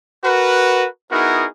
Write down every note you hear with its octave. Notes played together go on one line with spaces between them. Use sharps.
F#4 A#4 B4
B3 D#4 E4 F#4 G#4 A#4